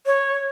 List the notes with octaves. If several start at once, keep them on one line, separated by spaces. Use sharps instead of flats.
C#5